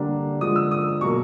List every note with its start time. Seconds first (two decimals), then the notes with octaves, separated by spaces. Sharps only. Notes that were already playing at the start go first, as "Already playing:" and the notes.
Already playing: D3 G3 A#3 D4
0.40 D3 F3 G#3 D#6
0.56 E6
0.71 D#6
1.01 B2 F#3 A#3 C#6